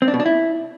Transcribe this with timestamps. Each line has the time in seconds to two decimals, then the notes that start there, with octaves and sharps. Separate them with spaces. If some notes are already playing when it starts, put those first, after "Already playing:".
0.02 C4
0.08 D4
0.14 B2
0.20 D4
0.26 E4